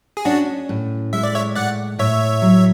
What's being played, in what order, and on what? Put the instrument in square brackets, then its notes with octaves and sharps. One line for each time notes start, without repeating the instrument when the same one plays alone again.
[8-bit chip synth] G#4
[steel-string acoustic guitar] C#4 [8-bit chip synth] D4 F#4
[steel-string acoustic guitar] A2
[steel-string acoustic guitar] G#3 [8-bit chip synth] E5
[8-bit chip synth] D5
C#5 E5
[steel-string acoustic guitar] A2 [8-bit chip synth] D5 F#5
[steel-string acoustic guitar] A2 [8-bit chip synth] C#5 E5
[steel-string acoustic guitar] F#3